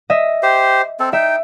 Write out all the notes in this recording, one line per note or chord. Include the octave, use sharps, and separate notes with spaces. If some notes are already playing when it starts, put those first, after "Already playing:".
D#5 E5
G4 C5
C4 A4
D#4 E5 G5